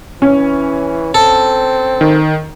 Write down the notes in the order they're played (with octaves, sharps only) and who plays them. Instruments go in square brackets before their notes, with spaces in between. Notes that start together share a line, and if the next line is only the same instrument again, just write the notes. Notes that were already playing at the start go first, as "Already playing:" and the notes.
[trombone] E3 [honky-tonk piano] C#4
[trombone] C4 [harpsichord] A4
[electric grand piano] D#3